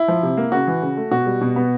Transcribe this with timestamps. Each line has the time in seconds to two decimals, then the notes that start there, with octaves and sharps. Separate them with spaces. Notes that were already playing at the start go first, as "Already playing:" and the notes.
Already playing: E4
0.08 F3
0.23 C3
0.37 A#3
0.52 C#3 F#4
0.67 E3
0.82 C#3
0.97 A3
1.11 B2 F#4
1.26 G3
1.41 B2
1.56 B3